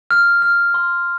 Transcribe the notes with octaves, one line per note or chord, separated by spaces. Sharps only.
F6
F6
C6